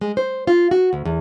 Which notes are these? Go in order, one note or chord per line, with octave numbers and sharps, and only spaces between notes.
G#3
C5
F4
F#4
D2
E2